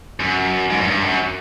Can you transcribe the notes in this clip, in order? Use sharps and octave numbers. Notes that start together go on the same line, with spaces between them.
F#2
G#2
F#2
G2
F#2